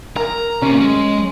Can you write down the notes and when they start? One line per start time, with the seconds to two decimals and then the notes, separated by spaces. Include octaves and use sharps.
0.16 A#4 A#5
0.62 C3 A#3 C#4
0.81 G#3